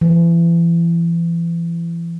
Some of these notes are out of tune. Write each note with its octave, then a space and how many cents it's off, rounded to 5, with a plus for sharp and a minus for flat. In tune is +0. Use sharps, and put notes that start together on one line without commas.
E3 +35